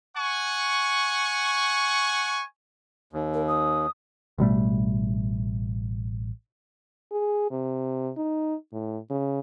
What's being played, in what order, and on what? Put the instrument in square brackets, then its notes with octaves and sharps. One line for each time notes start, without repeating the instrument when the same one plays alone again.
[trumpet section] F#5 G#5 C#6
[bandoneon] D#2
[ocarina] A#4
D#6
[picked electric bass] A1 B2 G3 A3
[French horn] G#4
C3
D#4
A2
C#3